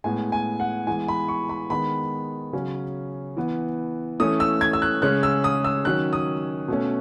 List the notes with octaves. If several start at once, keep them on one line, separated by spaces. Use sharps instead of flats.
A2 G#3 B3 G#5
G#5
F#5
E3 G#3 B3 G#5
B5
C#6
B5
D#3 G#3 B3 B5
C#3 F#3 C#4
E3 B3
E3 A3 C#4 D#6
E6
G#6
E6
F#6
C#3 G#3 C#4 F#6
E6
D#6
E6
D#3 F#3 C#4 F#6
D#6
B2 A3 C#4